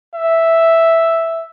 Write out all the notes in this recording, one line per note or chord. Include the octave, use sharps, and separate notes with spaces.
E5